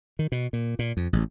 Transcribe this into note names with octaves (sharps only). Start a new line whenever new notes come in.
D#3
B2
A#2
A#2
F2
A1